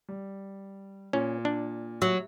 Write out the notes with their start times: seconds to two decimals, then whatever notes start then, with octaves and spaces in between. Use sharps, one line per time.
0.09 G3
1.13 A#2 C#4
1.45 D4
2.02 F#3